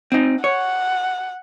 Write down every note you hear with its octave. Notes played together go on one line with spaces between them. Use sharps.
C4 D#4
C#5 F#5